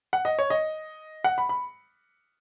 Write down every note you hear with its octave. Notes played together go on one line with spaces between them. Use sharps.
F#5
D#5
C#5
D#5
F#5
B5
B5